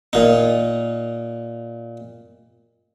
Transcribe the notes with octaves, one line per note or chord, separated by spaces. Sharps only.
A#2 D#4